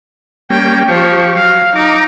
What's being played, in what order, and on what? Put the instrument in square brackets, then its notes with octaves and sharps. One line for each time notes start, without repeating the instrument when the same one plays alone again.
[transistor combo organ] G3 A#3 C#4 [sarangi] G5
[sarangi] F3 [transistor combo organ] G4 C#6
[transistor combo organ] F#3 [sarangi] F5
[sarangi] D#4 [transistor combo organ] A#5 D6